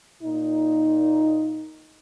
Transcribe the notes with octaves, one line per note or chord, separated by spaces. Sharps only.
A#2 D#4